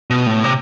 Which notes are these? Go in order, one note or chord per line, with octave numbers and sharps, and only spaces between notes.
B2
A2
C3